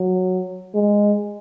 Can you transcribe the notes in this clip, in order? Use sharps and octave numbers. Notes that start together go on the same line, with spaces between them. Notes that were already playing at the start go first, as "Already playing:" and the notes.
Already playing: F#3
G#3